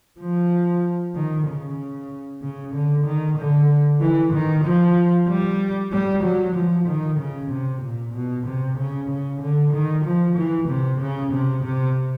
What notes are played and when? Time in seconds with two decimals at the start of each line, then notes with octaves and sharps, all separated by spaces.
0.20 F3
1.15 D#3
1.47 C#3
2.42 C#3
2.75 D3
3.06 D#3
3.38 D3
4.01 E3
4.33 D#3
4.65 F3
5.29 G3
5.93 G3
6.24 F#3
6.55 F3
6.88 D#3
7.19 C#3
7.51 C3
7.83 A#2
8.14 B2
8.46 C3
8.78 C#3
9.10 C#3
9.42 D3
9.73 D#3
10.05 F3
10.37 E3
10.69 C3
11.00 C#3
11.32 C3
11.64 C3